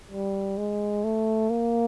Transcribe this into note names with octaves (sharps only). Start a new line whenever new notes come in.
G3
G#3
A3
A#3